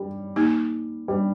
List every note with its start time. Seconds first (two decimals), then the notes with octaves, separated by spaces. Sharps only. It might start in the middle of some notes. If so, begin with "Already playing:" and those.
Already playing: G3
0.36 A#3 D#4 G4
1.08 G3